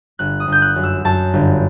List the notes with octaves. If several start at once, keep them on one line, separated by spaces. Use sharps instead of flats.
G1 F#6
D#6
G1 G6
F#6
F#2
E6
F#2 A5
G1